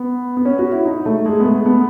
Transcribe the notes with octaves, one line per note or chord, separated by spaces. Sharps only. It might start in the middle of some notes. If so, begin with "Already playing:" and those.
Already playing: B3
B3
C#4
F#4
E4
D#4
A3
G#3
B3
A3
B3